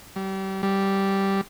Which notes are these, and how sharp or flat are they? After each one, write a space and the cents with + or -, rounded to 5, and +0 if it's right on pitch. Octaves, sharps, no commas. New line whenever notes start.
G3 -30
G3 -5